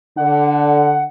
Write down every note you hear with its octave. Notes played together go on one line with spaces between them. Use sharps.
D3 F#5